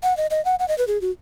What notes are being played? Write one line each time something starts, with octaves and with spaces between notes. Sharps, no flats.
F#5
D#5
D#5
F#5
F#5
D#5
B4
G#4
F#4